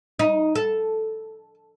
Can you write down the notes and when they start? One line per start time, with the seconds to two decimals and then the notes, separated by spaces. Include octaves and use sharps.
0.19 D#4
0.55 A4